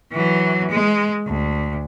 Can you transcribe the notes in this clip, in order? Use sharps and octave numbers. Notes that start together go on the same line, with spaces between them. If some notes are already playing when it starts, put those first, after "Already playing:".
E3 F#3
G#3
D2